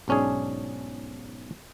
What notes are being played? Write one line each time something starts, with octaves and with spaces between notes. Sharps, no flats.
B1 G#2 C#4 D4 G#4